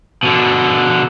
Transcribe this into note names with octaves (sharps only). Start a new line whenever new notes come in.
B2 D3